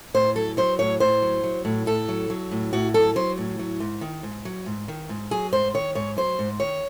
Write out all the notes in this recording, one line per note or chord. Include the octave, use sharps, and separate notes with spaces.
A2 C5
F#3 A4
F#3 C5
A2 C#5
A2 C5
F#3
F#3
A2
A2 A4
F#3
F#3
A2
A2 F#4
F#3 A4
F#3 C5
A2
F#3
G#2
D#3
G#2
F#3
G#2
D#3
G#2
F#3 G#4
G#2 C5
D#3 C#5
G#2 C#5
F#3 C5
G#2
D#3 C#5